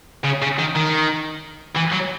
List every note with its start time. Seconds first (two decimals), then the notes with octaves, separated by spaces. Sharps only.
0.24 C#3
0.42 C#3
0.59 D#3
0.75 D#3
1.77 E3
1.93 F#3